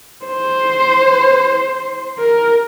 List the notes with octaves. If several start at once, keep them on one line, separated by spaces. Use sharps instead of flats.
C5
A#4